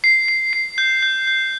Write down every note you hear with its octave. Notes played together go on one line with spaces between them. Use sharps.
C7
C7
C7
G6
G6
G6